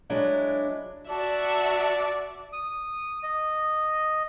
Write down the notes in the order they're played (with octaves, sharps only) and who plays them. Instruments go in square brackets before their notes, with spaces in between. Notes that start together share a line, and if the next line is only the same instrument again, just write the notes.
[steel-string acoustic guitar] F#3 G#3 D4 E4
[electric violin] F#4 E5 [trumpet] D5 [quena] A5
[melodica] D#6
D#5